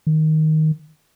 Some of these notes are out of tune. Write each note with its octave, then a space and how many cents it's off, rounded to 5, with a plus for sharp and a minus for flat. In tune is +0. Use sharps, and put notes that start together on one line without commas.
D#3 +5